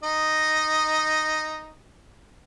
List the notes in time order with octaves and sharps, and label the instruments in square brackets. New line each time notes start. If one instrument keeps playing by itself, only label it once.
[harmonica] D#4 D#5